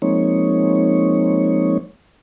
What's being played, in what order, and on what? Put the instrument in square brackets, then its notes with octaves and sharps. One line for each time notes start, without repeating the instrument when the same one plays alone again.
[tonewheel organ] F3 G#3 A#3 C4 D#4 C#5